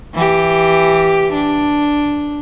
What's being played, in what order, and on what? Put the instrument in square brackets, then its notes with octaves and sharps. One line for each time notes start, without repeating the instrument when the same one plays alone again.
[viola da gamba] E3 G4
D4